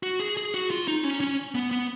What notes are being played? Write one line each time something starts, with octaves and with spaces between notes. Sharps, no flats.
F#4
G#4
G#4
F#4
F4
D#4
C#4
C#4
B3
B3